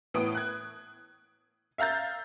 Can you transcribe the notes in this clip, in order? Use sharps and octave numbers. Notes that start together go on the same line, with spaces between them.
A2 E3 B3 D#6 D7
F#6 G#6
E5 F5 A#5 G6 A6